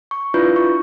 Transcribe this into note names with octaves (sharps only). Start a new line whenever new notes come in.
C#6
D4 E4 F4 B4 G6
C#6